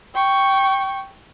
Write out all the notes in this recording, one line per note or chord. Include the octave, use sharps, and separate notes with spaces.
G5 C#6